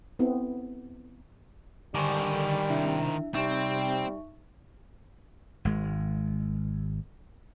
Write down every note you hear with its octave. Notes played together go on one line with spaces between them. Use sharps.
B3 C4 E4 A4
D3 D#3 G3 C5 G#5 C#6 D6
C3 D4 E4 E5
C3 G3 C4 D#4 E5 C#6
G#1 G#3